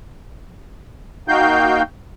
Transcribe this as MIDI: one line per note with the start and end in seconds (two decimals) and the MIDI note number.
1.28 1.82 58
1.28 1.82 63
1.28 1.82 66
1.28 1.82 77
1.28 1.82 79
1.28 1.82 91